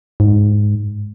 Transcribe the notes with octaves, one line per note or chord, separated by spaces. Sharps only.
G#2